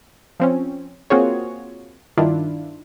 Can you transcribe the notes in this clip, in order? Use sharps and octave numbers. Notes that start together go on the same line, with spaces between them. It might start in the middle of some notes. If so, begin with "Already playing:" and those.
F3 C4 C#4
A#3 C4 F4 F#4 G#4 C#5
G2 D#3 D4 E4 F4